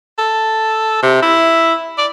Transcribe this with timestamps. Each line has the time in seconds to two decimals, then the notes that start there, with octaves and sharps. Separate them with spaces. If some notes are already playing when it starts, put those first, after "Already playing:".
0.18 A4
1.03 C3
1.22 E4
1.98 D5